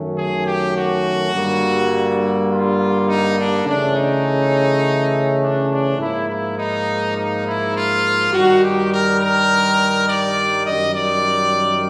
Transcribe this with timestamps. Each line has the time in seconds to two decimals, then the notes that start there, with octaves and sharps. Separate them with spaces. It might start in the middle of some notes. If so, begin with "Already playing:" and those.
Already playing: F#2 D#3 F#3 A3 C#4
0.16 G#4
0.46 G4
0.75 F#4
1.33 G2 D3 G3 A#3
2.49 F4
3.08 D#4
3.37 D4
3.66 C#3 E3 A3 C#4 D4
3.96 D#4
5.41 D4
5.70 D4
5.99 G#2 F3 A#3 E4
6.29 E4
6.58 D#4
7.16 D#4
7.45 E4
7.74 F4
8.33 G2 D#3 G3 F#4
8.62 G4
8.91 A#4
9.20 A#4
10.08 D5
10.66 F#2 D#3 G3 D#5
10.94 D5